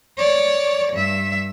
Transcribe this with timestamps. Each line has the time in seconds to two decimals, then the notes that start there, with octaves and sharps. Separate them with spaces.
0.18 C#5 D5
0.93 G2 E5